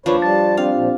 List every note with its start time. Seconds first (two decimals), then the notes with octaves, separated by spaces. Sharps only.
0.06 D#2 F3 D4 B4 C#5 F5
0.22 G3 A5 A6
0.57 G3 C4 D4 F4 G4 F5
0.75 A#2 F3